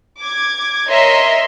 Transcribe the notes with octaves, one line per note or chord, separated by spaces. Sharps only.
D6 G#6
A#4 C#5 D#5 E5 A#5 C6